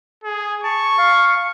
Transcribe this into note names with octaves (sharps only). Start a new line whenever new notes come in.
G#4
A5 C#6
F5